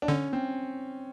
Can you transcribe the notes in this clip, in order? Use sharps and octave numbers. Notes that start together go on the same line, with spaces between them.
D4
D3 C#4
C4